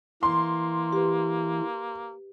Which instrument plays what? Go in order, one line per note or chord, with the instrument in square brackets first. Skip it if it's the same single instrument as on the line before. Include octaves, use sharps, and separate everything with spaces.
[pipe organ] E3 [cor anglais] A#3 [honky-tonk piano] C6
[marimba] G4 B4